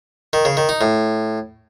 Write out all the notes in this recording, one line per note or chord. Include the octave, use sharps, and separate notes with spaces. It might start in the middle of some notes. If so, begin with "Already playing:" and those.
D#3
C#3
D#3
D#4
A2